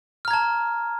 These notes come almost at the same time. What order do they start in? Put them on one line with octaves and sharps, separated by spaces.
F6 A#5 G#6 A5